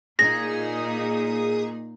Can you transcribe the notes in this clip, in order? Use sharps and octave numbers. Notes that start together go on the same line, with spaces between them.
A#2 D#4 G#4 A#6